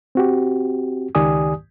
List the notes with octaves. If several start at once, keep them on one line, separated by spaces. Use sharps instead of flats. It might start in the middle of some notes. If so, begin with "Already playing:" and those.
C4 F#4 G4
C#2 D#3 G4 D5 G#5 D#6